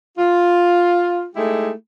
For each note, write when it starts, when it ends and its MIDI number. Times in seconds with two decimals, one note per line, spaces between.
0.17 1.23 65
1.35 1.70 56
1.35 1.70 57
1.35 1.70 63
1.35 1.70 64
1.35 1.70 67
1.35 1.70 68